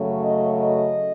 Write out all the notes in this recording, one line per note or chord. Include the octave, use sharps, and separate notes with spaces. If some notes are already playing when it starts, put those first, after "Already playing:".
Already playing: F#2 C#3 F#3 A3
D#5
D#5